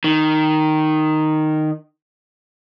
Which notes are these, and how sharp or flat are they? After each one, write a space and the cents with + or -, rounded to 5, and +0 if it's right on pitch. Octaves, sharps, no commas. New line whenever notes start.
D#3 -5